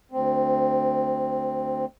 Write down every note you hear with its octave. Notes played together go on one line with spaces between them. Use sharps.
D2 C4